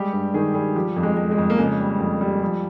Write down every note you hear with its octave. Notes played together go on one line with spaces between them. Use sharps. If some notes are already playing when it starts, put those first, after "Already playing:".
Already playing: G3 G#3 G4
G2
D#3 G#4
G3 G#4
F3 G4
F2
G#3
G#3
G#3
F2
A#3
C#3 G#3
G3
F2
G3
F3